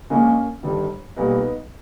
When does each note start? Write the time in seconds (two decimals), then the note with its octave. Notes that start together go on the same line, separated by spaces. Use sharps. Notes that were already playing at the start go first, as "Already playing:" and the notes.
0.10 A#1 A#2 G#3 A#3 C#4
0.63 G1 G2 D#3 G3
1.16 B1 A#2 G3 B3 D#4